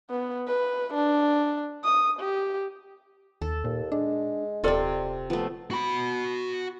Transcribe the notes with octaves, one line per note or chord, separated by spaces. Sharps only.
B3
B4
D4
D#6
G4
D#2 A4
D#2 A#2
G#3 D4
D#1 C3 C4 F4 A4 D5
F3 A3 B3
F#4 B5